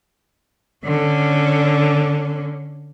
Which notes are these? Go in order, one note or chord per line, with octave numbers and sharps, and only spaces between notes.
D3 C#4